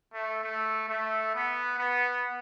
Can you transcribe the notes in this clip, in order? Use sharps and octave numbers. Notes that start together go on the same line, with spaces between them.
A3
A3
A3
B3
B3